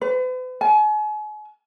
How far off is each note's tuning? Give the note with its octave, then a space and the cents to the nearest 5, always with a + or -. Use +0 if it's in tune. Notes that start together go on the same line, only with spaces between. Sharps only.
B4 +45
G#5 +40